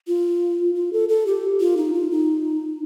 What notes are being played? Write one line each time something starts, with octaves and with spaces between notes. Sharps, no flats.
F4
F4
A4
A4
G4
F4
D#4
F4
D#4